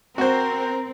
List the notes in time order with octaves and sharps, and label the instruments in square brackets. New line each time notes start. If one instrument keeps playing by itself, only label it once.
[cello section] C4 [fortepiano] F#4 C5 [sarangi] A#4